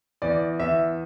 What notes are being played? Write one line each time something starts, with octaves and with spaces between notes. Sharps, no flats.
E2 D5
E2 E5